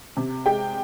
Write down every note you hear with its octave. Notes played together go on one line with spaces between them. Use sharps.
C3
G#3 G5